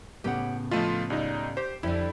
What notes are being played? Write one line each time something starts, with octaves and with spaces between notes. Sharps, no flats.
A2 C#3 B3 G4 F#5
F3 A3 F4 B4 D#5 A5
C#2 G3 D#4
G4 C5
F2 D3 G3 E4